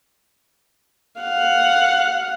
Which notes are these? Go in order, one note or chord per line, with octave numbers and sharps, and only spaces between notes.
F5 F#5